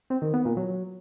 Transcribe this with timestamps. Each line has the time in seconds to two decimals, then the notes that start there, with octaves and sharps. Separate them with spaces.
0.10 C4
0.22 D#3
0.34 B3
0.45 A#2
0.57 F#3